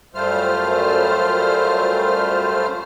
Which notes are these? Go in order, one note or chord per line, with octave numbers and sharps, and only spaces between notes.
F#2 G3 A3 F4 C5 F6